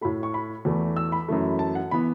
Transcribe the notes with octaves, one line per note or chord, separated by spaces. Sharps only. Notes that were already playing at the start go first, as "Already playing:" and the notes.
A2 A3 B5
C#6
B5
E2 E3 A3
E6
B5
F#2 E3 A3
A5
F#5
E3 B3 B5